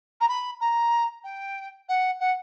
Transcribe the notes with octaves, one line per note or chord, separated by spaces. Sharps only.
A#5
B5
A#5
G5
F#5
F#5